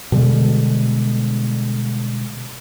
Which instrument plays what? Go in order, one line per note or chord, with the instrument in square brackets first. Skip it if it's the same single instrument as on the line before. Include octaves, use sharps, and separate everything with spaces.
[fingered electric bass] B2 D3 G3 G#3